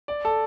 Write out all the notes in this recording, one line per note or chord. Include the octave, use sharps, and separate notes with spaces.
D5
A4